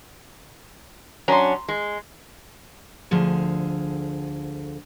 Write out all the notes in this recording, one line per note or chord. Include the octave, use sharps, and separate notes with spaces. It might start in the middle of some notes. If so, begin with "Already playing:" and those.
F#3 C#4 D4 A#5 C6
G#3
D2 D3 F3 G#4